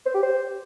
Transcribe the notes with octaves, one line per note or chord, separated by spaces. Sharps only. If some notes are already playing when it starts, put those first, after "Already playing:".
C5
G4
C5